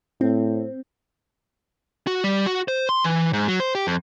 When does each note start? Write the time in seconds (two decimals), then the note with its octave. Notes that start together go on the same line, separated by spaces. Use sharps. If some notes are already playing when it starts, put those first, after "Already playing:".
0.21 A2 C4
2.07 F#4
2.24 G3
2.46 F#4
2.68 C5
2.89 C6
3.04 E3
3.33 G#2
3.48 F#3
3.60 C5
3.75 G4
3.87 F2